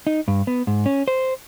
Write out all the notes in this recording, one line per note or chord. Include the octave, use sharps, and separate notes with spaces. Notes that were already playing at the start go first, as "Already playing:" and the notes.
D#4
G2
B3
G#2
C#4
C5